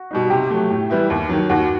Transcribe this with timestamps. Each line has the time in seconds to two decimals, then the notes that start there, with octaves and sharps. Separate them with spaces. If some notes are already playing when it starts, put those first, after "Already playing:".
Already playing: F#4
0.11 B2 G3 D#4
0.30 C3 G4
0.50 F#3 A3
0.70 A2
0.90 E3 G3 B3 E4
1.10 D#2
1.29 D#3 F#3
1.49 D#2 F#4